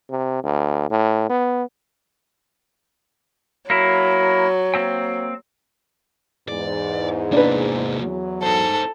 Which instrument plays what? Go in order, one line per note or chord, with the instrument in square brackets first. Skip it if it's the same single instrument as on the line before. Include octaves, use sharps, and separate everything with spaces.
[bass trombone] C3
D2
A2
B3
[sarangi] F#3 [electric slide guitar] A#3 E4
[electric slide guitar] A#3 C4 G5
[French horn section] E2 G#2 [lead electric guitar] D5
[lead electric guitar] C3 A#3 [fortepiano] D4 B4
[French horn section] E2 F#3
[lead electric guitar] D#4 C5 [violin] A4